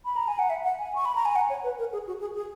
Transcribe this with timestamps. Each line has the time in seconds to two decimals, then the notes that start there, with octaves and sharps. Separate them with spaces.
0.05 B5
0.16 A#5
0.28 G#5
0.39 F#5
0.50 E5
0.64 F#5
0.79 G#5
0.95 C#6
1.05 B5
1.15 A#5
1.25 G#5
1.36 F#5
1.50 C#5
1.64 B4
1.79 A#4
1.92 G#4
2.07 F#4
2.21 G#4
2.35 G#4